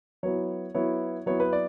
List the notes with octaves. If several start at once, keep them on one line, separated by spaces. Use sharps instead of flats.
F#3 B3 E4 C#5
F#3 B3 E4 C#5
F#3 B3 E4 C#5
B4
D5